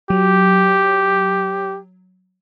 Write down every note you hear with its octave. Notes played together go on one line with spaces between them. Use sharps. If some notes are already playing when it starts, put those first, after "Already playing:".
F#3 G4